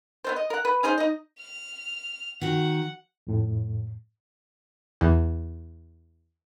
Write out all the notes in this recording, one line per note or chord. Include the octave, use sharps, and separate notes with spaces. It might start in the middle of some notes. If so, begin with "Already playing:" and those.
B3 D4 C5
D#5
A#4 F#5
B4
C#4 D#4 G#4 C5
D#4 D#5
F6
D#3 F#4 F#5
F2 A2
E2